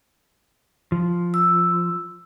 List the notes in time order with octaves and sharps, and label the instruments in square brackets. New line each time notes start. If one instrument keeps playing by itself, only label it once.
[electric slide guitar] F3
[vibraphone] E6